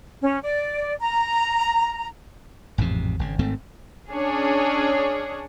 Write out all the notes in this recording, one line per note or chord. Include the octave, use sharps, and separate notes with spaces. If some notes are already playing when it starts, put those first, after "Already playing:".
C#4
D5
A#5
A1 F2 G#2 C3
G#1 C#3
G#1 G#2 A3 C4
C#4 D4 G#4 C#5